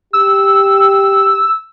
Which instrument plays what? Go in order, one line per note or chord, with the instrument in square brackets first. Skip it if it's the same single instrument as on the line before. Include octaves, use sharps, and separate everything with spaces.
[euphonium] G4 [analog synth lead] E6